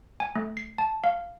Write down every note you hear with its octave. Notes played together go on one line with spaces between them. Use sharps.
G#5
A3
C7
A5
F5